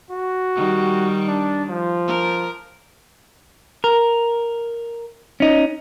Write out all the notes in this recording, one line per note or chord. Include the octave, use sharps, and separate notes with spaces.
F#4
D#3 G3
D4
F3
A#4
A#4
C#4 D#4